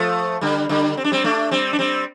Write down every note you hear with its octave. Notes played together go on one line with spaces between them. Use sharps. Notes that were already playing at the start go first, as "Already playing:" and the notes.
Already playing: F3 A3
D3 G3
D3 G3
C4
D4
G3 C4
A3 D4
G3 C4
D4
G3 C4